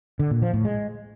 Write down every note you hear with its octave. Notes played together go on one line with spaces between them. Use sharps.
D3
A#2
F3
A2
G#3